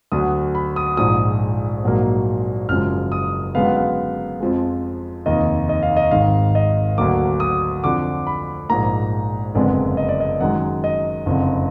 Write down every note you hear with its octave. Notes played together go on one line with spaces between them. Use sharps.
D2 D3 F#3 D#6
B5
D#6
A#1 G#2 F3 D#6
A#1 G#2 F#3 A#3
F#1 F#2 F3 G#3 F6
D#6
F#2 D3 G#3 B3 F5
F#5
F5
F2 F3 G#3
F1 D#2 D#3 D#5
D#5
F5
D#5
G#1 G#2 D#3 F5
D#5
D2 D3 F#3 A#3 D6
D#6
F2 D3 F3 D6
B5
A#1 G#2 F3 A#3 A#5
F#1 F2 D3 G#3 B3 D5
D#5
D5
D#5
F#2 D#3 G#3 F#5
D#5
F#1 F2 D3